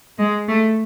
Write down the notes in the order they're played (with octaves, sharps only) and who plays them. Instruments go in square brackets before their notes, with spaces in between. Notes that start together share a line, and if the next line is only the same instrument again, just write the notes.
[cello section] G#3
A3